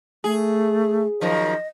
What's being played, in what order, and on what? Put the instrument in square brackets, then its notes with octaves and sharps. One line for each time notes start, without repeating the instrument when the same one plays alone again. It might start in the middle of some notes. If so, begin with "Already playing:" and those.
[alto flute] A3 [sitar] G#4
[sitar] F#2 D#3 F3 [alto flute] D#5